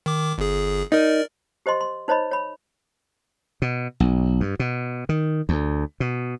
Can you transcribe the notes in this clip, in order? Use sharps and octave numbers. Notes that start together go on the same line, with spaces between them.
D#3 D6
G1 G#4
D#4 A#4 D5
G4 C5 D#5 C6
C6
D#4 C5 C#5 D#5 B5
C#5 B5
B2
B1
G2
B2
D#3
D2
B2